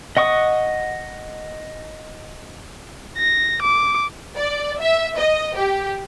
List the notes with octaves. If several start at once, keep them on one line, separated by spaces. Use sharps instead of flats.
D#5 F#5 C#6 D#6
A#6
D6
D5
E5
D#5
G4